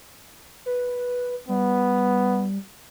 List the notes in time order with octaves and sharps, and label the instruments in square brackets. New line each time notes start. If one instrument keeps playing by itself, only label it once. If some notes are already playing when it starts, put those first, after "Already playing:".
[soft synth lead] B4
[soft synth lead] G3 [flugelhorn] B3